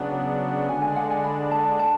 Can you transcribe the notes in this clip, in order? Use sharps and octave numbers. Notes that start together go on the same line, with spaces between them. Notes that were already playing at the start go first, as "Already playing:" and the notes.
Already playing: C#3 F#3 B3 D4
D3 G#3 D4 G#5
G#5
F#5
G#5
B5
A5
A5